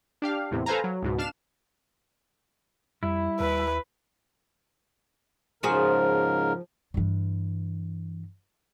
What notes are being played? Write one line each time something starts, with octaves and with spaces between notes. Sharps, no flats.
D4 G4 F5
E2 A2 C3
A4 B4 C5 F5 G#5 A#5
F#3
C#2 G#2 B2
D4 F5 F6 E7
F2 G3 E4
D#2 B4
G#2 C#3 F3 F#4 G#4 A#4
G2 E3